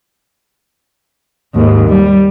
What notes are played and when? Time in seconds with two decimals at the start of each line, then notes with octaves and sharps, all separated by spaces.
1.55 D#2 G#2
1.89 G3